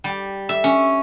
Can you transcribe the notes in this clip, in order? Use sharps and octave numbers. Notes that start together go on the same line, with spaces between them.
G3
E5
C#4